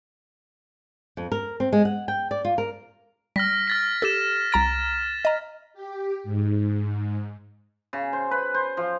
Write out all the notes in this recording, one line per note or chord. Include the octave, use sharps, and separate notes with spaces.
F2
A#4
C4
G#3
F#5
G5
D5
F4
A#4
G3 F6 A#6 B6
F6 A6 B6
G4 A4 A6 E7
C2 A#5 A6 D7
D#5 A#5
G4
G#2
C#3
C5
B4
C5
F3